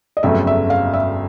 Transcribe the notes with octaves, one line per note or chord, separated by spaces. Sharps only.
D#5
G1 F2 C#3 F#3 A3 E5
E5
F5
E5